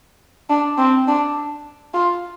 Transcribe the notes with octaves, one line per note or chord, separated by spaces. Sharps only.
D4
C4
D4
F4